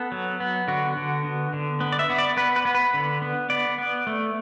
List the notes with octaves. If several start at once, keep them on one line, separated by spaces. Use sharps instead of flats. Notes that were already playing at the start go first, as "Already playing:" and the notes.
Already playing: B3 A4
F#3
B3
D3 F#4
D3
B3
D3
B3
D5
E5
B3
D5
B3 B4
B4
B3
B4
D3
B3
B3 D5
B3
A3